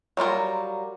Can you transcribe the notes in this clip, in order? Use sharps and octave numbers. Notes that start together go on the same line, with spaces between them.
F#3 G3 F4 A#4